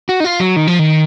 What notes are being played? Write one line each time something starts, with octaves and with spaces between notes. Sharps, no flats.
F#4
D#4
F4
F#3
D#3
F3
D#3